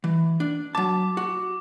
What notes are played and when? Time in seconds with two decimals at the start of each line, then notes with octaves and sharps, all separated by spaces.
0.04 E3
0.40 D4
0.75 F#3 A5 D6
1.17 F#4